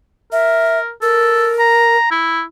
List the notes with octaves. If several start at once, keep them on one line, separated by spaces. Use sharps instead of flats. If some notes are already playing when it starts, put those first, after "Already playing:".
A#4 E5
A4 A#4
A#5
E4